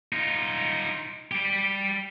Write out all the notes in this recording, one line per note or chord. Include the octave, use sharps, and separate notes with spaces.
D#4 F4
G3 G4